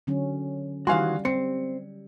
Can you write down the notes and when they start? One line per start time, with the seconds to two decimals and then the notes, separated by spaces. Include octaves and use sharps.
0.07 D3 F#3 C#4
0.87 D#3 E3 G3 F#4 F5 G#5 C6
1.25 C4 C#7